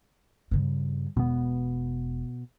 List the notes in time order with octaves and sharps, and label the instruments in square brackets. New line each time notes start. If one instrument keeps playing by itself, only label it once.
[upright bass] G2 C#3
[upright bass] E1 [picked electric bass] B2 B3